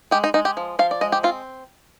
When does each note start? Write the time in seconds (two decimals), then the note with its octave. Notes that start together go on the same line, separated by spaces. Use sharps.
0.11 G#3 G4
0.24 D#4
0.34 G#3 D#4
0.45 G4
0.57 F3
0.79 F3 F5
0.91 D5
1.01 G#3 D#5
1.12 G4
1.23 C4 F4